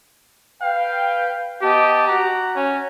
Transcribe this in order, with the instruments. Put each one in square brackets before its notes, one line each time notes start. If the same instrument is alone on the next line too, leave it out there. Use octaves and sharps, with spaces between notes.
[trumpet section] B4 G5 [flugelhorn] F5
[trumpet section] B3 D#5 A5 [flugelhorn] G4
[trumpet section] F#4 F#5 A#5
[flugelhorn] C#4